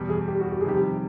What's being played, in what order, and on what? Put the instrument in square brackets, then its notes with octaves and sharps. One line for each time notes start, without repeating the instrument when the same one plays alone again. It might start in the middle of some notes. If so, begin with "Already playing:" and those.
Already playing: [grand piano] E2 B2 G3
[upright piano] G#4
G4
F#4
G4
G#4
[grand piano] F2 C3 D#3 G3 [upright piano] G4